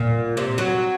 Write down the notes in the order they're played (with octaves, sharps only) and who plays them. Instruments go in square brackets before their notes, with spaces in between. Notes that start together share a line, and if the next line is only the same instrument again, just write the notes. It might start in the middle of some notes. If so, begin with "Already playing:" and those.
Already playing: [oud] A#2
C3
F#3